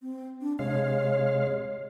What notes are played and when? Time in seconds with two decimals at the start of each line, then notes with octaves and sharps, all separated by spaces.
0.02 C4
0.41 D4
0.59 C3 G#3 C#5 F5